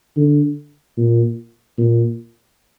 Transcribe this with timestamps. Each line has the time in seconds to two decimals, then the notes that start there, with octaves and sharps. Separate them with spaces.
0.17 D3
0.97 A#2
1.78 A#2